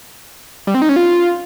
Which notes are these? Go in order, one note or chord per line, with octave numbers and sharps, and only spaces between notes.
G3
C4
D#4
C#4
F4